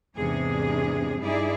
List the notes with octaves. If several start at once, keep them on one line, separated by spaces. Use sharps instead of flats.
E2 G#2 C3 D4 G#4
G2 D#4 E4 G#4 D5